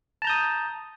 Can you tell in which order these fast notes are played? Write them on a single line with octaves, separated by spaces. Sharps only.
A5 A#5 G6 D#6